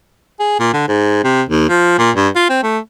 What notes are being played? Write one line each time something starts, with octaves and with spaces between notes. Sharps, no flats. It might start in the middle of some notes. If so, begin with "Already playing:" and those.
G#4
A#2
D3
G#2
C3
D#2
F3
A#2
G2
F4
C4
A3